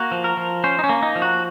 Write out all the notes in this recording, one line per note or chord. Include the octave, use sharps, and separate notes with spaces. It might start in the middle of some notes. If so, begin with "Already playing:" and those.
Already playing: A#3 F#4
F3
A#4
F3
C#4 C5
D#4
C#4
A#3
D#4
F3
F#4